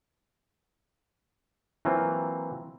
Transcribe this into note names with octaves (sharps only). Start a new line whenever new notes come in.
E3 F#3 A#3 C4 F4